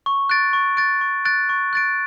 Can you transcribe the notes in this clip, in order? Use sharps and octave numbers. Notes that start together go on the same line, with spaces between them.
C#6
F#6 A6 D7
C#6
F#6 A6 D7
C#6
F#6 A6 D7
C#6
F#6 A6 D7